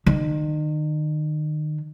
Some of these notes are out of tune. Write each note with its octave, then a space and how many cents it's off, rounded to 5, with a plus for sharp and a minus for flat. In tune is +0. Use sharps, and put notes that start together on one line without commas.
D#3 -35